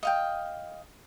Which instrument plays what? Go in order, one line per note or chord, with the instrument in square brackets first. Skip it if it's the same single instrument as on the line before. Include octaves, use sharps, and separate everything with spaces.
[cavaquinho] D#5 F5 G5